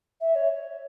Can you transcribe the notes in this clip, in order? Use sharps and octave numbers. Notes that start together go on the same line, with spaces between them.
E5
C#5